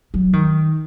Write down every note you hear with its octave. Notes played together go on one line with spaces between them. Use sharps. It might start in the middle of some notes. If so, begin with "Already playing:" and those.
F#3
D#3